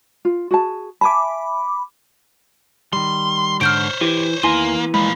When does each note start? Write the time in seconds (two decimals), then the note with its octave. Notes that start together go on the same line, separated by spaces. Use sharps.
0.25 F4
0.51 F#4 G#4 A5
1.01 E5 G#5 A5 B5 D6
2.93 D#3 G3 C6
3.61 G#2 D3 C5 C#5 F6 G6 D7
4.01 E3 G4
4.43 E2 D#3 E3 A#3 G#5 C6
4.94 F3 G#3 A#3 B5